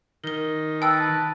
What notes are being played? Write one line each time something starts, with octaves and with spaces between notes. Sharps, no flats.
D#3 A#4 G7
B4 G5 A5 E6